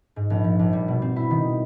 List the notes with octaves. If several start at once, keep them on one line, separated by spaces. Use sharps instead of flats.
G#2
A#1
F3
A#1
G3
B2
C4
E4
D#3